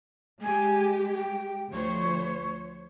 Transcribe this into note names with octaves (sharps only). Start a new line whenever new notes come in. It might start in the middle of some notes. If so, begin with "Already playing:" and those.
G#3 G4 G#5
G5
D2 F3 C5 C#5